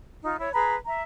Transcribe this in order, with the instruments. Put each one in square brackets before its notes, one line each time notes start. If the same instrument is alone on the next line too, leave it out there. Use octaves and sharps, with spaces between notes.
[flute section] D#4 F4
E4 C#5
G#4 B4 A#5 B5
E5 A#5